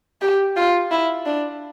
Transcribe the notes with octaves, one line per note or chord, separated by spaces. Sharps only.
G4
F4
E4
D4